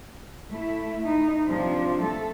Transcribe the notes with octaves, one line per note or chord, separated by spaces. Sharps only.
A3 E4
D#4
C3 F3 D4
A3 A4